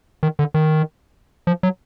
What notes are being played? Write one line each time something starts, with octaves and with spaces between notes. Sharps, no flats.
D#3
D3
D#3
F3
F#3